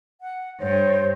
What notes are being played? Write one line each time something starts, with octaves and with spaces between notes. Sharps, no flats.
F#5
G2 C5 C#5